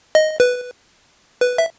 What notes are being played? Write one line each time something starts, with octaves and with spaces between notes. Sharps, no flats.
D#5
B4
B4
E5